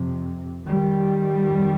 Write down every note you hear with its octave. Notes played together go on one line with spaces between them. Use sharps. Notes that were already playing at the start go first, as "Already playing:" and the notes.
Already playing: F2 C3
D#3 G3
F2